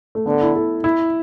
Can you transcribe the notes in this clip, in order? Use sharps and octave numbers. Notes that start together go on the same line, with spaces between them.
A3
D3 B3
E4
A4
E4